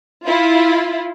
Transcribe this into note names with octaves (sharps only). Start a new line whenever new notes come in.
E4 F4